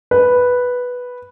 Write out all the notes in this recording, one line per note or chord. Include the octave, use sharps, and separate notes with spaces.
B4